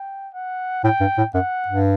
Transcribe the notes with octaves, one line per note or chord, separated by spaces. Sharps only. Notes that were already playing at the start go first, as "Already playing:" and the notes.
Already playing: G5
F#5
A2 G5
G2
A2
F#2 F#5
G2